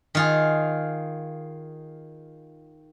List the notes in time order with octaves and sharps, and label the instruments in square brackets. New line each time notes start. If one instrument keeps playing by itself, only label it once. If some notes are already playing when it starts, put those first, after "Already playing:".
[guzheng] D#3 F4 G#4